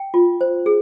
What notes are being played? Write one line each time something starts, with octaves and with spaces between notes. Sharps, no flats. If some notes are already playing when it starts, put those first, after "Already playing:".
Already playing: G5
F4
C5
G#4